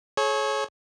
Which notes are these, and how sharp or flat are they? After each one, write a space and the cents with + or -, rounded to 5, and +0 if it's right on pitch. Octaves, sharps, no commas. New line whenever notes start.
G#4 +45 C#5 -15